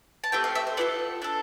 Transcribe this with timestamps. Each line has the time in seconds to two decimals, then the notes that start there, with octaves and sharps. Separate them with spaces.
0.24 A5
0.32 A3 C4 G4 G5
0.44 F5
0.55 E5
0.67 C5
0.77 B3 F4 A4 D5
1.22 D4 A4